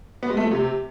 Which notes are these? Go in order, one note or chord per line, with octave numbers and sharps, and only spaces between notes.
B3
G#3
A3
F3
C3